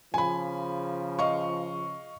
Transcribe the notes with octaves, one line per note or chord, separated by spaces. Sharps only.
C#3 F3 G#5 B5
D#5 F5 C#6